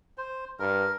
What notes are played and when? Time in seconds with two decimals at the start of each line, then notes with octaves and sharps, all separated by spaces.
0.18 C5
0.59 G2 A#4